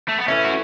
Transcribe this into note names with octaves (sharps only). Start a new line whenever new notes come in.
A3
B3
E3 A3 C#4 E4
F#4